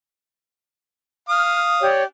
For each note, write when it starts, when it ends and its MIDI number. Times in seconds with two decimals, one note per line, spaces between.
1.29 1.88 77
1.29 1.88 87
1.29 1.64 89
1.81 2.03 67
1.81 2.03 73
1.81 2.03 74